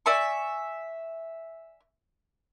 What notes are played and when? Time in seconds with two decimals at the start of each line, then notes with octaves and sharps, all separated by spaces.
0.06 D5 E5 G#5 C#6